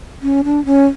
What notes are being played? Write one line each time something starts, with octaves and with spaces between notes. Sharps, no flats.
C#4
D4
C#4